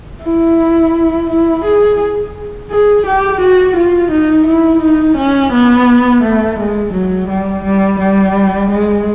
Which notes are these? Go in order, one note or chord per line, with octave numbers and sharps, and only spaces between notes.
E4
E4
G#4
G#4
G4
F#4
F4
D#4
E4
D#4
C#4
B3
A3
G#3
F#3
G3
G3
G3
G#3